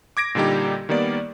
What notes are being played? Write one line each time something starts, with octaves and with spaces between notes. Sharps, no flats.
D6 G#6 A#6 D7
A#2 D3 G3 D#4 G4
D#3 G3 A#3 B3 D5